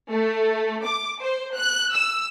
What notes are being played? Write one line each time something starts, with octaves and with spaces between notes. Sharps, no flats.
A3
D6
C5
F#6
E6